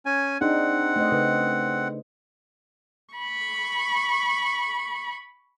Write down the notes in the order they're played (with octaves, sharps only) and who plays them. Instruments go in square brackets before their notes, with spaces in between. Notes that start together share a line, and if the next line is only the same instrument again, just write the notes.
[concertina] C#4 G#5
[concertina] C4 F#5 [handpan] D4 D#4 G#4
[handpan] A3 C5 D#5
C#3 B4
[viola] B5 C#6